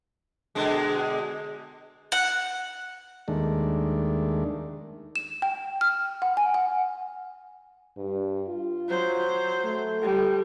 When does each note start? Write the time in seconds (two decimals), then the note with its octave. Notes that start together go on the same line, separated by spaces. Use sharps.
0.55 B2 D3 G#3
2.12 F#5
3.28 D#2 D#3 G#3 A3 D4
5.16 E7
5.42 G5
5.81 F6
6.22 F#5
6.37 G#5
6.54 F#5
7.97 G2
8.48 F4
8.89 F#3 C5
9.64 A3
10.02 G3 A4